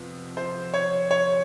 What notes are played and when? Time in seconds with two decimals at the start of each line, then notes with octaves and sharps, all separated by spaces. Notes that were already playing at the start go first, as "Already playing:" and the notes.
Already playing: F2 C3 B3
0.37 C5
0.74 C#5
1.11 C#5